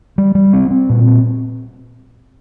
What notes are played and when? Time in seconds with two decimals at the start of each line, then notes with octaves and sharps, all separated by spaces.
0.18 G3
0.35 G3
0.53 C4
0.71 C4
0.89 A#2
1.07 C4